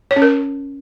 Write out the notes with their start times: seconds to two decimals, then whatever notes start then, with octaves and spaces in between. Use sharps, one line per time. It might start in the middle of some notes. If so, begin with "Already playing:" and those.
0.11 C#5
0.16 C#4
0.22 A#4